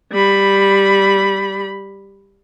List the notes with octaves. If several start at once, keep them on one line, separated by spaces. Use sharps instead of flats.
G3 B5